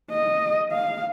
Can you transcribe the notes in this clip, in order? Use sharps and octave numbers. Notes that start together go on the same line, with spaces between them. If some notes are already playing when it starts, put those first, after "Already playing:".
D#5
F5